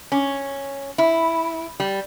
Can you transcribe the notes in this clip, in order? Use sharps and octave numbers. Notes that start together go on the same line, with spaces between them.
C#4
E4
G3